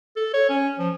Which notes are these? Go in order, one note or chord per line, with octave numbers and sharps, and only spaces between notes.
A4
C#5
C#4
F3